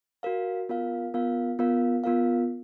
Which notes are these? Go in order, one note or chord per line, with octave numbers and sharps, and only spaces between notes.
F#4 A#4 F5
B3 F4 A#4 F5
B3 F4 A#4 F5
B3 F4 A#4 F5
B3 F4 A#4 F5